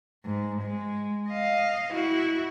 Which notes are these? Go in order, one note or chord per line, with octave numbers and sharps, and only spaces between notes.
G#2
G#3
D#5 F5
E4 F#4